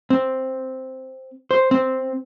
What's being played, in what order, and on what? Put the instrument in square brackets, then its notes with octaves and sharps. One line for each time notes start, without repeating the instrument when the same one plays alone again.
[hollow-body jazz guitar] C4
C5
C4